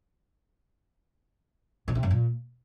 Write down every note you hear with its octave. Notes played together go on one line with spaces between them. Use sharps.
B2
C3
F#2
A#2